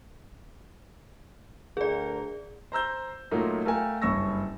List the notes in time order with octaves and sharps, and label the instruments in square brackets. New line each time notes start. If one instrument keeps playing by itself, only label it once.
[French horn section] D2 A#4 [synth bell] G#4 D5
[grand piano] C5 A#5 E6 G6
A#2 F#3 A3 A#3 D#4 F4
A3 A4 A#4 F5 G5 G#5
F#1 G2 C#5 C#6 E6 A#6